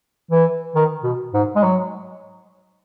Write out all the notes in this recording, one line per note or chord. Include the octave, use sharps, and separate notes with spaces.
E3
D#3
B2
G#2
G#3
F#3